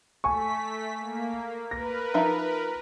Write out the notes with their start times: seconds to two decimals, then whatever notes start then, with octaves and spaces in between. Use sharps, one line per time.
0.24 A3 G#5 C#6 B6
0.99 A#3
1.71 A#4 B4 A#6
2.14 F3 D#4 E5